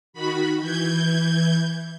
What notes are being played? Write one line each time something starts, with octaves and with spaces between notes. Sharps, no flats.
D#3 F#4 B5
E3 G6 G#6